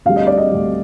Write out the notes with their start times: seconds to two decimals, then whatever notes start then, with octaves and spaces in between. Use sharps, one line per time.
0.06 D2 D3 G3 F5
0.16 D#5
0.27 D5
0.38 D#5
0.51 D2 D3 G3